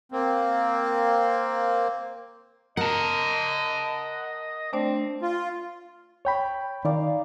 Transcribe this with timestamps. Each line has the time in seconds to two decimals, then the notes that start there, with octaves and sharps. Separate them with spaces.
0.12 A#3 C4
2.77 A#4 D#5 F#5 A5
4.73 A3 C4 D4 D5
5.22 F4
6.25 C#5 G5 B5
6.85 D#3 D#4 D5 F5